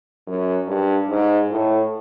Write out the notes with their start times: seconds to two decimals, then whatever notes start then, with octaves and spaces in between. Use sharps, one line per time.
0.27 F#2
0.67 G2
1.09 G#2
1.50 A2